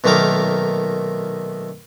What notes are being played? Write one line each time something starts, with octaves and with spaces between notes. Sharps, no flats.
B1 A#2 D#3 A3 A#4 D6